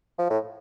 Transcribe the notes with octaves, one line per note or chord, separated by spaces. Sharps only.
F3
A2